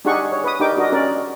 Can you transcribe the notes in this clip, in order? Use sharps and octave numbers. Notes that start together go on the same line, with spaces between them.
D4 D#4 G4 G#4 F#5 C#6
C#5
B4 D#6
D4 D#4 G4 A#4 G5 D6
D4 F#4 A#4 D#5
C#4 A#4 D5